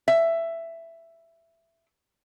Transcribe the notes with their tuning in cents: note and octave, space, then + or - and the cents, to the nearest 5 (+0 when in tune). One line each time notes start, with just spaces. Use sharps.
E5 +10